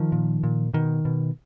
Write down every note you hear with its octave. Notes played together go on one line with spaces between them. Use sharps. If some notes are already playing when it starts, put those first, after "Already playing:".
Already playing: D#3 F3
A#2
A#2
B2 D#3
B2